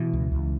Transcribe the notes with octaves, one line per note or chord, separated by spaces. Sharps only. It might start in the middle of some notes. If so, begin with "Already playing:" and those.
Already playing: B2 E3
C#2
C#2